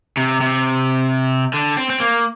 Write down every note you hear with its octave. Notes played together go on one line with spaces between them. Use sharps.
C3
C3
D3
C4
C4
A#3